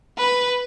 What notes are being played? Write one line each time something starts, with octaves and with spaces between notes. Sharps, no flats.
B4